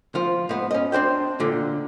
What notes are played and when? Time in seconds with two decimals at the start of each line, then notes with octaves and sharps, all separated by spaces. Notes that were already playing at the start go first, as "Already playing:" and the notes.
0.15 F3 F4
0.49 G#2 B3
0.71 C#4 D#5
0.92 C4 D4 C5 G5
1.40 A#2 D3